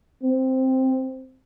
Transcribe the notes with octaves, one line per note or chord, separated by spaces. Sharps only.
C4